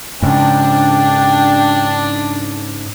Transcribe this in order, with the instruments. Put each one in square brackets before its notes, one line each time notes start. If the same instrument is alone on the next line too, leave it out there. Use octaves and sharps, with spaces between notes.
[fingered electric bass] G#2 C#3 [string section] D4 [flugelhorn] G5